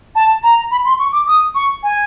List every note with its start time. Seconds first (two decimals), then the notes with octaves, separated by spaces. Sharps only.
0.15 A5
0.43 A#5
0.71 B5
0.85 C6
0.99 C#6
1.13 D6
1.28 D#6
1.55 C#6
1.83 G#5